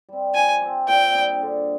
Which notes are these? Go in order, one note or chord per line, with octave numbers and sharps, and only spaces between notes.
G3 C4
F3 G#5
C4 G4
A#2 G5
G3 D4 G#4
D3